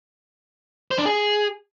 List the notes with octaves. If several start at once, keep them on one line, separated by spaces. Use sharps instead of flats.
C5
D4
G#4